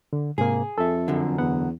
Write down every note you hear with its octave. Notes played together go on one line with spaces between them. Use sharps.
D3
G#2 C3 A#3 G#4
F2 A4 E5
F#2 D3
E2 B3 F#5